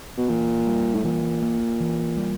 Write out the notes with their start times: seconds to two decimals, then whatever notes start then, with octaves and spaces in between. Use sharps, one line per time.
0.18 B2
0.29 A#2 E3
0.67 G3
0.95 A2
1.04 A#2 E3
1.42 A#3
1.80 E3
2.17 G3